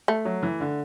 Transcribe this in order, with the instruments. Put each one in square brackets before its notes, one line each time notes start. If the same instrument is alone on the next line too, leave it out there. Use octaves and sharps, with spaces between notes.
[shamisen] A3
[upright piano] F#3
E3
D3